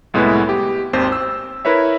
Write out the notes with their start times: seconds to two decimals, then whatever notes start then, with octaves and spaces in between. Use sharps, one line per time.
0.14 C2 A2 G#3 B3 E4 B4
0.49 G4
0.93 G#1 D#2 C4 C5
1.12 E6
1.65 E4 A#4 B4 C#5 E5